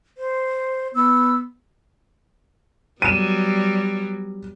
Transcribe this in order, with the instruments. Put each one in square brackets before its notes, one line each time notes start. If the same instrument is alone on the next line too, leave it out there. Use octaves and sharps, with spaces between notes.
[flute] C5
[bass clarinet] B3 [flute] E6
[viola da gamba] F#3 G3 B3 [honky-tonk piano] D#7 E7